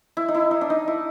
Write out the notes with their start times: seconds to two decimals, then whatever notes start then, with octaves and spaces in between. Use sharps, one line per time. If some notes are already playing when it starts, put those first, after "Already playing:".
0.17 E4
0.28 D#4
0.35 E4
0.51 D#4
0.61 D4
0.70 D#4
0.88 E4